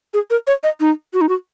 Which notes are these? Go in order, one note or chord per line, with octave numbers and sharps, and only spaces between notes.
G#4
A#4
C#5
D#5
D#4
F#4
D#4
F#4